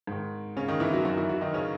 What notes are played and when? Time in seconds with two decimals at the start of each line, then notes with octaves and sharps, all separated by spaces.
0.07 G#2 D#3
0.57 C#3 C#4
0.68 D#3 D#4
0.80 E3 E4
0.93 F#3 F#4
1.05 F#2 D#3 F#3 F#4
1.17 E3 E4
1.29 F#3 F#4
1.41 D#3 D#4
1.54 C#3 C#4